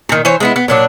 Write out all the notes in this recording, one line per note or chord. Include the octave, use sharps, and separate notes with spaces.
A#2 D#3
E3 C5 C#5
G#3 B3 E4
B3
A#2 F#3 D4